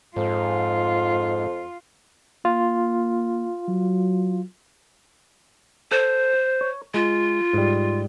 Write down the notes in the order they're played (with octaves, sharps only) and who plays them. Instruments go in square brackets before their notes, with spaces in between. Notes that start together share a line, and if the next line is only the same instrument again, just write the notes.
[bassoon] F2 [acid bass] G#2 [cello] F4
[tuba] A#3 [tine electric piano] F4
[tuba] F#3
[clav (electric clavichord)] A4 [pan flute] C5
[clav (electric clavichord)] C#5
[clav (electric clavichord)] G#3 [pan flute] F4
[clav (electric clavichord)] G#2 G3